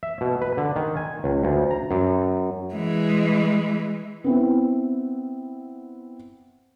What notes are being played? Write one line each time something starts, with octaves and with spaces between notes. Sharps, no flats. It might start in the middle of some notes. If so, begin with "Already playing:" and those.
E5
B2
B4
D3
D#3
G#5
C#2
D2
A#5
F#2
E3 G#3
B3 C4 E4